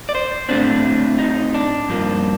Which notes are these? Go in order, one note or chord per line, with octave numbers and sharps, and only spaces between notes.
D5
C5
A2 A3 C4 D4
D#4
D4
G2 F3 A#3